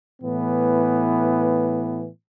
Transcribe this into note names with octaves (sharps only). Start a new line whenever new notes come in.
A2 E3 B3